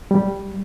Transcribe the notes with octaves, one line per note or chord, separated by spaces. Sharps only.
G3